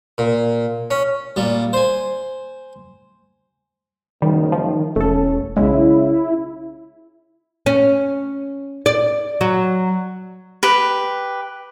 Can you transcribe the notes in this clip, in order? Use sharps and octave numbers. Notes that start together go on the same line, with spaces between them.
A#2
C#4
A#2 G3
C5 G#5
F#1 D#3 G3
F3
E1 A3 C#4 A4
B1 C#3 G#3 E4
C#4
D5
F#3
G4 B4